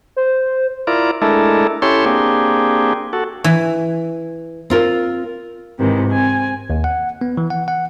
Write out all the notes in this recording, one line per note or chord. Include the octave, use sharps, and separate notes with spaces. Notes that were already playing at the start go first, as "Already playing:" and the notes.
C5
E4 F4 A#4 D5
G#3 A3 D4 E4 A4 A#4
C#4 E4 G4 A4 C#5 C6
A#3 C4 D4 G4 G#4
F#4 A4
E3
C4 F4 A#4
G#2 C3 D#3 E3
C4 G#5
D#2
F#5
B3
E3
F#5
F#5